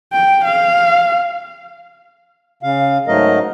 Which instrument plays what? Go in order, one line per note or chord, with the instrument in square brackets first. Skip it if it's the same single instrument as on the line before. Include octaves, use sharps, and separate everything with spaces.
[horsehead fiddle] G5
F5
[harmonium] C#3 F5
G#2 F#3 A3 A#4 D#5